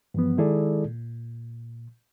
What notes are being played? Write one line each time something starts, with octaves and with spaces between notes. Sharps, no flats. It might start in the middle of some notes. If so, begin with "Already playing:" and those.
G2 E3 F3 B3
D#3 G#3 E4 G#4 A4 D5
A#2